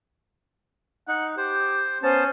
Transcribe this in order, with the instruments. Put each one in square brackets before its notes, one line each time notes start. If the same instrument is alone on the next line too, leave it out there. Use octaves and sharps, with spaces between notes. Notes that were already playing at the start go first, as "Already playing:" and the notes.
[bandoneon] D#4 [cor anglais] F#5
[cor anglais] G4 [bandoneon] C5
[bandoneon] B3 A5 [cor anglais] C#4 [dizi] C5